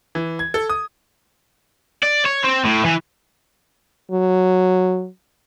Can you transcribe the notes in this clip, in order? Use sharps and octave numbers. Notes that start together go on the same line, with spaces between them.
E3
G#6
A4
D#6
D5
C#5
C4
A2
E3
F#3